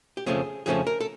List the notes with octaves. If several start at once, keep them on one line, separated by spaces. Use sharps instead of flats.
G4
F2 C#3 F3 A3 C#4 G#4
F2 C#3 F3 A3 C#4 G#4
A#4
A4